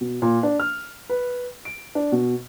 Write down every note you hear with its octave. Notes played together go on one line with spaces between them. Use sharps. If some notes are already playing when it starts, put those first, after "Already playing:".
B2
A#2
D4
F6
B4
D7
D4
B2